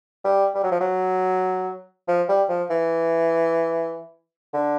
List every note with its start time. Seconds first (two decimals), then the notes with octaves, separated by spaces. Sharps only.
0.24 G3
0.55 G3
0.64 F#3
0.71 F3
0.81 F#3
2.08 F3
2.29 G3
2.49 F3
2.70 E3
4.54 D3